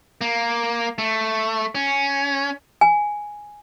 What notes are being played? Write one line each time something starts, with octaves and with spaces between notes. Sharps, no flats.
A#3
A3
C#4
G#5